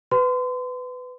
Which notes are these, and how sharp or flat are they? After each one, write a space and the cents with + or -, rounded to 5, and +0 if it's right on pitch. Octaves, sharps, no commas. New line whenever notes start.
B4 +20 C6 -35